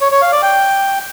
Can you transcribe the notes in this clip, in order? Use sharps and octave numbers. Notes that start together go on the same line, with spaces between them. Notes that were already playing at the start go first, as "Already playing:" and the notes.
C#5
C#5
F5
D5
G5